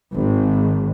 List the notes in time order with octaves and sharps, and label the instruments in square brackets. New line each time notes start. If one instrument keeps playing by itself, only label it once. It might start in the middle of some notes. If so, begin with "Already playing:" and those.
[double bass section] G#1